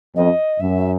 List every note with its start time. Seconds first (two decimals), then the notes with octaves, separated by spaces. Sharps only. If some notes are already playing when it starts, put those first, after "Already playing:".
0.15 F2 D#5
0.60 F#2 E5